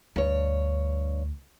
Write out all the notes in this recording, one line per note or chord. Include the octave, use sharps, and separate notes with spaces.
D2 G2 C#5